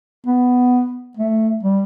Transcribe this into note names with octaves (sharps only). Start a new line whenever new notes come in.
B3
A3
G3